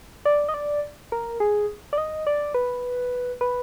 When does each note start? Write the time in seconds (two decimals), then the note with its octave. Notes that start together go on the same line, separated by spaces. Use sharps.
0.25 D5
0.49 D#5
0.54 D5
1.12 A#4
1.40 G#4
1.93 D5
1.98 D#5
2.27 D5
2.54 B4
3.41 B4